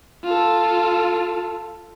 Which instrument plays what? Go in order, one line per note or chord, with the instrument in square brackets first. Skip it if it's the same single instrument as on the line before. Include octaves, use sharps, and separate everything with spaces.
[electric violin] F4 A4